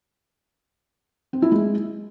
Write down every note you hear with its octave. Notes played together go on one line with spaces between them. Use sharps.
C4
E4
G#3